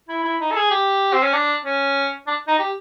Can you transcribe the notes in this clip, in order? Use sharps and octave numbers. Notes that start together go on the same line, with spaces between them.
E4
E4
D#4
A4
G#4
G4
C4
C#4
D4
C#4
D4
D#4
G4